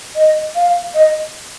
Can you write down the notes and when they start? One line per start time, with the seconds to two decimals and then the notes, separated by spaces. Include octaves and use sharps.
0.15 D#5
0.55 F5
0.94 D#5